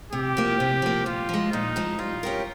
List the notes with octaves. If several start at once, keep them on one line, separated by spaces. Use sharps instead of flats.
C3 G4
F3 A#3
C3
F3 A#3
A#2 F4
F3 G#3
A#2 D#4
F3 G#3
G3 F4
C#4 G4 A#4